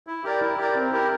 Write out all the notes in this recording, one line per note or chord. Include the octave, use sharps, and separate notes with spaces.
E4
G4 A#4 D5
E4
G4 A#4 D5
C4
E4 G4 A#4